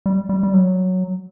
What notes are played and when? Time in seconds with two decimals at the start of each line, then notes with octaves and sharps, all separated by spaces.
0.06 G3
0.29 G3
0.43 G3
0.53 F#3